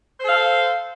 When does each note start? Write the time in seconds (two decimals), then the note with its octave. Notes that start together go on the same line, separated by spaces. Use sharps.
0.19 C5
0.24 A4
0.28 F5